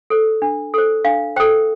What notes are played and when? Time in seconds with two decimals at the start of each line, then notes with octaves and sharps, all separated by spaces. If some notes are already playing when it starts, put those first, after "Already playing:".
0.10 A4 C5
0.42 D4
0.74 A4 C5
1.05 D4 F5
1.36 A4 C5 G5